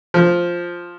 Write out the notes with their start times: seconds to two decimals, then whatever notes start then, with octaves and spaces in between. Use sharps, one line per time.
0.14 F3